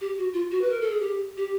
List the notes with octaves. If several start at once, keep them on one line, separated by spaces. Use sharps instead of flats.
G4
F#4
F4
F#4
B4
A#4
A4
G#4
G4
G4